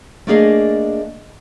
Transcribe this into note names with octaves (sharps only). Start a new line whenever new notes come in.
A3 A#3 D4 G#4 D#5 F5